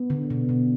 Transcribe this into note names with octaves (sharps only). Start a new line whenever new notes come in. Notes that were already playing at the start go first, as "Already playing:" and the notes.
Already playing: B3
D3
B2
B2